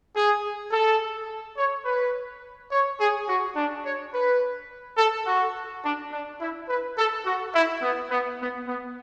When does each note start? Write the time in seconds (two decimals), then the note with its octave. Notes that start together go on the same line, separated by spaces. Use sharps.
0.14 G#4
0.71 A4
1.56 C#5
1.84 B4
2.70 C#5
2.98 G#4
3.27 F#4
3.55 D4
3.84 C#5
4.13 B4
4.97 A4
5.26 F#4
5.83 D4
6.11 D4
6.40 E4
6.67 B4
6.96 A4
7.25 F#4
7.53 E4
7.81 B3
8.10 B3
8.39 B3
8.67 B3